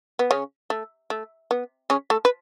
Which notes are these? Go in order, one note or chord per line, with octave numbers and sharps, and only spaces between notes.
B3
C#3 C#4
A3
A3
B3
C#3 C#4
A3 A4
B4